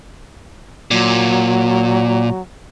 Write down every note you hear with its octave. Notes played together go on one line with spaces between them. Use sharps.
A#2 F#3